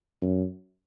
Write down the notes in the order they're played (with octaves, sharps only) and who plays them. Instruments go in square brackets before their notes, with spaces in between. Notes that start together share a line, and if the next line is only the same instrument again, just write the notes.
[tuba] F#2